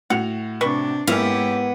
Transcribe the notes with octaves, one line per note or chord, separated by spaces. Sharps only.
A2 F#4 F#5 F7
C3 D4 B4 C#6
G#2 A#3 B3 C#4 E4 G4 E5 F5